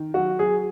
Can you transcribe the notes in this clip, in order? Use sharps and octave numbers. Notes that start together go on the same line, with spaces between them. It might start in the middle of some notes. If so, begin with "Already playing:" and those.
Already playing: D#3
F#3 F#4
F#3 G#4